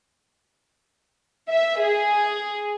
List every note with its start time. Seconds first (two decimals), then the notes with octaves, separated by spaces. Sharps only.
1.49 E5
1.81 G#4